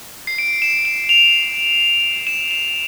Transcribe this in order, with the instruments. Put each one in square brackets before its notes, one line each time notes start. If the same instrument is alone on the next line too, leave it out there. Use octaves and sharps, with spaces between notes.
[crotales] C7
D7
E7
E7
F7
E7
E7